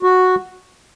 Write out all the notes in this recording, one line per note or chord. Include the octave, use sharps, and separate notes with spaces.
F#4